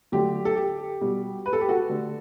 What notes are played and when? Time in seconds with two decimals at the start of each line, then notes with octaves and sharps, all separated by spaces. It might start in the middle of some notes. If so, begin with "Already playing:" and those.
0.12 D3 F#3 A3 G4
0.45 A4
0.56 G4
1.01 B2 G3
1.46 B4
1.53 A4
1.61 G4
1.69 F#4 A4
1.90 D3 A3